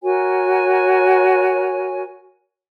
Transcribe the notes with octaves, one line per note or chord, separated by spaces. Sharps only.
F#4 A#4 C#5 G#5